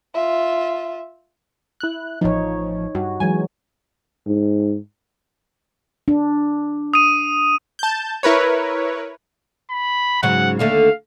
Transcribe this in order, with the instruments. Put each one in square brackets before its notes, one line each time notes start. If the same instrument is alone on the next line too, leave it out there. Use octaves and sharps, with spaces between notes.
[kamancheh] F4 E5
[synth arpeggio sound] E4 F#6
[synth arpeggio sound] A1 F3 [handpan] D#4 C#5
[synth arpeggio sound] G2 [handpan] F#4
[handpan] E3 F#3 G#3 [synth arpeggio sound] G#5
[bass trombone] G#2
[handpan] D4
[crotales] D#6 D#7
[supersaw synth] A5 G6
E4 A#4 B4 C#5
[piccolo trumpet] B5
[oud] G#2 C#3 F#3 [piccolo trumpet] F#5
[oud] D#2 D3 A3 [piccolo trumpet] F5